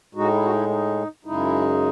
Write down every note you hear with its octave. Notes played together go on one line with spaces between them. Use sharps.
A2 G#3 D#4 F#4
E4
F#4
E4
D#4
F#2 C#3 G#3 D#4 E4